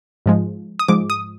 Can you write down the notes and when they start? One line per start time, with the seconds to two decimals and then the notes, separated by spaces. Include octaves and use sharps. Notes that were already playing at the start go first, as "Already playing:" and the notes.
0.26 G#2 F3 G#3
0.79 D#6
0.88 G#2 F3 G#3 D6
1.10 D#6